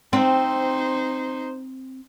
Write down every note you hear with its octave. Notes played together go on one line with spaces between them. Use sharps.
C4 D#4 C5